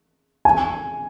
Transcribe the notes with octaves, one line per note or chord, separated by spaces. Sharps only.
G#5